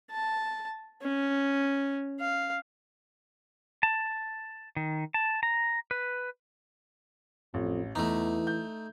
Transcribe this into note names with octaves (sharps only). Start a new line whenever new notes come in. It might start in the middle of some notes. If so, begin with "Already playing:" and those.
A5
C#4
F5
A5
D#3
A5
A#5
B4
A1 F2
E2 E3 A3 D#4
G6